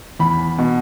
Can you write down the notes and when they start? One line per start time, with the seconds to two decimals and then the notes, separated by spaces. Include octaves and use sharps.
0.19 E2 B5
0.58 B2